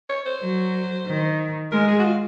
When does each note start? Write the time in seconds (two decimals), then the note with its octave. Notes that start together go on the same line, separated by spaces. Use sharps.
0.09 C#5
0.26 C5
0.42 F#3
1.06 D#3
1.72 G#3 A#4
1.88 G#4
1.99 F#4
2.04 F4